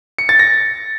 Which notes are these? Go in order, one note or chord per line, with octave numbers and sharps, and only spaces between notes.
C#7
A6
A#6